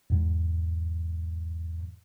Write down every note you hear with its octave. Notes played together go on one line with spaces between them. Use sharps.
E2 G#2